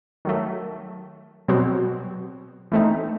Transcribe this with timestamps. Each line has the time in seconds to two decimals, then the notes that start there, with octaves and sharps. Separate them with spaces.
0.25 D#3 F#3 A3
1.48 B2 F#3 C4 F#4
2.72 E3 A3 C4 D#4